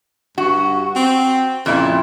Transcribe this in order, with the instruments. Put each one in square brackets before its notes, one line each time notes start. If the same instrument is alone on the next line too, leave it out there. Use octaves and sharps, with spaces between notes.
[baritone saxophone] G2 [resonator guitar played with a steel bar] F#4
[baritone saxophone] C4
[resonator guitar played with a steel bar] F2 A#2 E4 [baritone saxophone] C#3